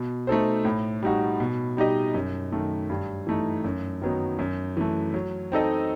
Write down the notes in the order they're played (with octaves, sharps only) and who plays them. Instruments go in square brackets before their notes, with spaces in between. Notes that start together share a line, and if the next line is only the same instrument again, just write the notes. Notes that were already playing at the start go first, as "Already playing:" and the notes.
Already playing: [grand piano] B2
A3 D#4 A4 C5
A2
G3 D#4 F#4
B2
G3 D#4 G4 D#5
F#2
D#3 A3
G2
E3 A3 D#4
F#2
D#3 F#3 B3 D#4
F#2
E3 A3
F#3
C4 D#4 A4 D#5